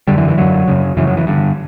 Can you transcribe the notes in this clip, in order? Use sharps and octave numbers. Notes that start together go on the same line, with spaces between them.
F#2 D3 G3
E3
E3
F#2 D3 F#3
F#2 C#3
F#2 C#3 E3
F#3
E3
G2 D3